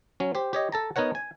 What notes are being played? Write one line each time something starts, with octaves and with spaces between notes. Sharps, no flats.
F#3 C#4
G4 C5
G4 C#5 D#5
A4 A5 A#5
B3 D#4 A#4 C#5 F#5
G#5